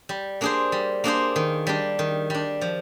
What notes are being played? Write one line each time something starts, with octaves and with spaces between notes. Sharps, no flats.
G3
A#3 D4 G#4 C5
G3
A#3 D4 G#4 C5
D#3
G3 D4
D#3
G3 D4
F3